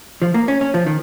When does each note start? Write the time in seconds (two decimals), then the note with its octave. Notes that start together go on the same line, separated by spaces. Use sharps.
0.22 F3
0.34 A#3
0.48 C#4
0.61 C#4
0.74 F3
0.87 D#3